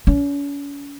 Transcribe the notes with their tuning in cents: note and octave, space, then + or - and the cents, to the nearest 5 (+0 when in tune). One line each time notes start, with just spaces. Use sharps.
C#4 +40